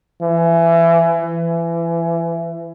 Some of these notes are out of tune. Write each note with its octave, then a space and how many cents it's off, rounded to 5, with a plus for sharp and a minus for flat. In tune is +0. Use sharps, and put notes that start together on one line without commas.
E3 +25
E3 +25